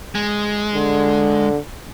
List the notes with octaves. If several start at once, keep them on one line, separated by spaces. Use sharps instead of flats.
G#3
D3